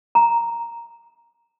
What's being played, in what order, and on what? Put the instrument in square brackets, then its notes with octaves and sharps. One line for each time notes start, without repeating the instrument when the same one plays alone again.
[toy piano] A#5